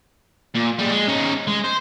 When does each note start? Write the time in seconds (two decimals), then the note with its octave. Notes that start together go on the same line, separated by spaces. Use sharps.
0.55 A#2
0.79 G3 G#3
0.91 G#3
1.08 C#4 D#4
1.47 G#3
1.64 C5